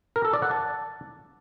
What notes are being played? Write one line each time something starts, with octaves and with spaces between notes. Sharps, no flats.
A#4
A4
D5
F#5
A5